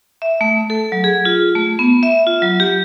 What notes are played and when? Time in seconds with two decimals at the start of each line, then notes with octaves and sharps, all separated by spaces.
0.22 E5
0.41 A3
0.70 A4
0.92 F#3
1.04 G#4
1.25 F4
1.56 A3
1.79 B3
2.03 E5
2.27 F4
2.42 F#3
2.60 G4